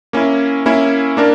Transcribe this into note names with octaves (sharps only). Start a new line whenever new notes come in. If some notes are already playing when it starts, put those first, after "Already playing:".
A#3 C#4 E4
A#3 C#4 E4
A#3 D4 A#4